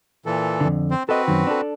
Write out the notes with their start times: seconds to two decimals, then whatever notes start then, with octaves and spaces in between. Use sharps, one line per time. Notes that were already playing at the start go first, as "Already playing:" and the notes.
0.26 A#2 E3 A4
0.61 F2 D3
0.91 C4 C5
1.09 C4 F#4 A4 B4 D#5
1.28 F#2 D#3
1.47 D4 A4